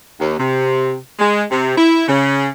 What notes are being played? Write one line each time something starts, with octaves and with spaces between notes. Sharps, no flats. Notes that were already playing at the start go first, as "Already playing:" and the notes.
D#2
C3
G#3
C3
E4
C#3